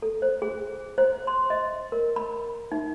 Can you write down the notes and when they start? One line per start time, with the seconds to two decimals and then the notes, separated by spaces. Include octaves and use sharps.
0.02 A4
0.22 C5
0.42 G#4
0.98 C5
1.27 C6
1.50 D#5
1.92 A#4
2.16 B5
2.72 D#4